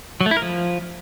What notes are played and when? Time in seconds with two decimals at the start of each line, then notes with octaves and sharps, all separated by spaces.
0.21 F#3
0.26 A3
0.31 E4
0.37 A#4
0.42 F3